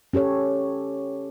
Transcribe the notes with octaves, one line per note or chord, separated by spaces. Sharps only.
C#4 G4 A4 C#5